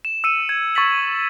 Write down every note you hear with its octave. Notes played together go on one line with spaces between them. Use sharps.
E7
E6 C#7 D#7
G#6
C#6 A6 B6 F#7